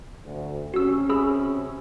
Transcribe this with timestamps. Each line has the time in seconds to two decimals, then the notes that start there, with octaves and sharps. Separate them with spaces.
0.23 D2
0.74 C3 C#4 F#4 E6
1.09 G#4 B5 E6